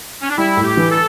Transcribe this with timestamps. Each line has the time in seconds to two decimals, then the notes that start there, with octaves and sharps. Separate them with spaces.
0.22 C#4
0.30 D4
0.38 G3 E4
0.57 A2
0.63 G4
0.77 E3
0.91 A4